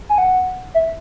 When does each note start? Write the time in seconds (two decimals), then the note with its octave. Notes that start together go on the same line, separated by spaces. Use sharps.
0.09 G#5
0.18 F#5
0.74 E5